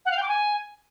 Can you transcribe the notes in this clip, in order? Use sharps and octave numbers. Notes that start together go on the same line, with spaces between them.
F#5
F5
G5
D6
G#5